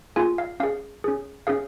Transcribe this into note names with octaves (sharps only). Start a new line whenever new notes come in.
A#3 F4 G#4 G#5
F5
C#4 G#4 F5
C#4 G#4
C#4 G#4 F5